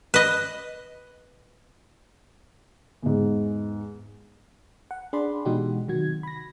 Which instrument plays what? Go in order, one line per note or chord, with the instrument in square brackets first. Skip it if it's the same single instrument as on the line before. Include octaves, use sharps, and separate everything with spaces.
[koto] B4 D#5
[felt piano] E2 G#2
[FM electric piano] F#5
D4 G#4 D5 B5 C6
B2 E3 G#3 D#4 F#4 G4
C3 D#3 F#3 F#4 G#6
B5 A#6